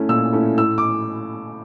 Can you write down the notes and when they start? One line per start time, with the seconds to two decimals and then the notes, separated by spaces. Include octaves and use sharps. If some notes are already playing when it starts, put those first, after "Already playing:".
Already playing: A3 C#4 E4
0.09 A#2 E6
0.33 A3 C#4 E4
0.58 A2 E6
0.78 D6